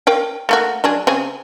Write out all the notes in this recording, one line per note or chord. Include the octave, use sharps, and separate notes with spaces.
A#4 F5 G5
A3 A#3 F#4
F#3 D4 G#4
C#3 C4 G#4